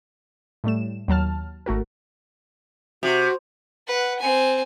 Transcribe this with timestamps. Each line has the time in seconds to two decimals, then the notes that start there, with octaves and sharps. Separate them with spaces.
0.64 A2 G3 A3 E7
1.08 D#2 F#3 A5 F6
1.66 G#1 A3 F#4 A#4
3.03 C3 F#4
3.87 B4 F#5
4.19 C4 G#5